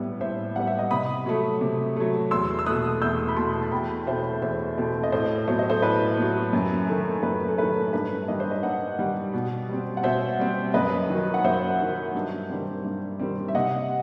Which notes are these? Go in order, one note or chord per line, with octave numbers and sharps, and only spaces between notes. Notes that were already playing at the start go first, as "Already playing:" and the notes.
Already playing: A2 G3 B3
A2 C5 E5
G3 B3 F#5
E5
D#5 F#5
C3 B5 D#6
F#3 A3
C3
F#3 A3
E2 C6 E6
E6
B2 A3 D#6 F#6
E2 E6 G6
B5
B2 A3 A5 C6
A5
E2 G5 B5
B2 A3 C4 C5 E5
E2 C5 E5
B2 A3 C4
D#5
A2 A4 C5
F#3 B3 C5
D#5
A4 C5
A2 B4
F#3 B3
F#2
D#3 A3
F#2 B4
A4
D#3 A3 B4
G2 B4
D#3 G3 D#5
C5
B4 D#5
G2 D#5 F#5
D#3 G3
B2
G3 C4
F#5
B2 C5 E5
G3 C4
F#2 B4 D#5
D#3 F#3
F#5
F#2 C5 E5
D#3 F#3
G2
D#3 G3 C4
G2
D#3 G3 C4
E5
C3 D#5 F#5